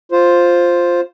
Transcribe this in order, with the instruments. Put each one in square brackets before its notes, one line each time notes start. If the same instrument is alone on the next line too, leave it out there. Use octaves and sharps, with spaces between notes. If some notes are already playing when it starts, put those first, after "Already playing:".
[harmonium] F4 C5